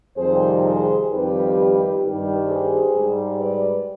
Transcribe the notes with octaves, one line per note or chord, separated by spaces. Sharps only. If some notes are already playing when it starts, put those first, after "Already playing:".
F2 C3 D#3 G3 G#4 C5
G#4 C5
F2 D#3 G3 G4 B4
G2 D#3 G3
G#4 C5
G#2 G3
B4 D5